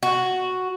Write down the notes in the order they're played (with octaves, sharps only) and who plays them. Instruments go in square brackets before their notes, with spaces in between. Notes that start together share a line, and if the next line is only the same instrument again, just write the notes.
[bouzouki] F#4